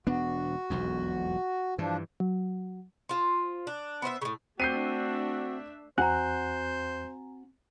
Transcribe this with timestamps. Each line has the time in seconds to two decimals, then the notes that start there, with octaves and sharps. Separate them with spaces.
0.07 E1 B3 D4 F#4
0.70 E1 B1 F2
1.78 G2 E3 F3 D4
2.20 F#3
3.09 F4 C5
3.67 D4
4.02 B3 C5 D#5 E5
4.22 A2 C#3
4.60 A3 C4 D4 F#4 E5 G6 C7 D#7
5.98 E2 C4 F#4 C5 F#5 G#5 A#5 F#6